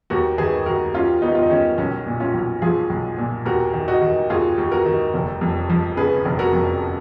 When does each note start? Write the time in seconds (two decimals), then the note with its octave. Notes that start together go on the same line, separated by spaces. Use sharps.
0.10 D#2 F#4 A#4
0.38 D#3 G#4 B4
0.66 D#3 F#4 A#4
0.94 D#2 C#4 F4
1.22 D#2 B3 D#4
1.35 F4
1.42 D#4
1.50 D#3 C#4
1.78 B1 C#4
2.06 A#2
2.20 C#4 F4
2.34 B1
2.62 F3 F4 G#4
2.90 B1
3.18 A#2
3.45 D#2 F#4 A#4
3.74 D#3
3.88 D#4 F#4
4.01 D#3
4.30 D#2 F4 G#4
4.58 D#2
4.71 F#4 A#4
4.86 D#3
5.14 F1
5.41 F2
5.70 F3
5.97 C#3 G#4 B4
6.25 F1
6.39 F#4 A#4
6.53 F2